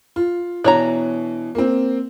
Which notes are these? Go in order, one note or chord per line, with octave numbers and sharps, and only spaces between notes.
F4
B2 E3 D4 C#5 A#5
A#3 C4